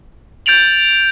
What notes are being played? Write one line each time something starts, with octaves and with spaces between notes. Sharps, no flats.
G6 A6 D7 F7 F#7